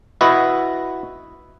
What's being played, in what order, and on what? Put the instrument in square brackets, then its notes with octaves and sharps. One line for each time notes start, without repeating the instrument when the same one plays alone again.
[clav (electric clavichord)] E4 F#4 B4 D#5